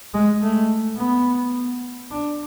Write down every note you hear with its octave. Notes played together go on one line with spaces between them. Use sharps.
G#3
A3
B3
D4